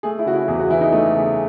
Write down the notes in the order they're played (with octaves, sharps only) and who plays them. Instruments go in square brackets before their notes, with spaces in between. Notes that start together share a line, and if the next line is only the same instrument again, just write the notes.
[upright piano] A3 G#4
E4
C#3 F#4
E4
E2 G#4
F#4
E3 E4
D#4
A3
C#3